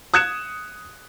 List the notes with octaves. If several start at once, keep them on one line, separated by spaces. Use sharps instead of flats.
D#6 F#6 G#6 C#7 E7